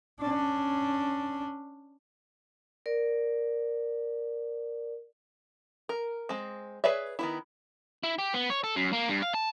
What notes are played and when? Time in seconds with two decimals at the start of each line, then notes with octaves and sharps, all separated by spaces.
0.20 C#4 D4
2.86 A#4 D5
5.89 A#4
6.29 G#3 C4
6.84 G#4 B4 C#5 D5 E5
7.19 D#3 B3 E4
8.03 E4
8.19 G4
8.34 B3
8.50 C#5
8.64 A4
8.76 F#2
8.93 A#3
9.09 G2
9.22 F5
9.34 A5